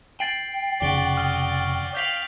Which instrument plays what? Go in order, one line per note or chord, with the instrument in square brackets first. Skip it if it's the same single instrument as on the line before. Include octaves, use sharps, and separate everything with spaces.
[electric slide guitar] G5 [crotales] A6 C7 F#7
[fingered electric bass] F1 C#3 [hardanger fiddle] F#4 D5 [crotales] B6 D7 G7
[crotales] C#6 D#6 F6
[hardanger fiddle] F5 [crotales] G6 B6 F#7